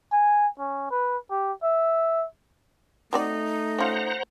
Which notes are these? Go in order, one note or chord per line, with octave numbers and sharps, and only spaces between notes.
G#5
C#4
B4
G4
E5
F#3 A3 C4 D#4 D5
C#4 F4 C5 F#5 A#5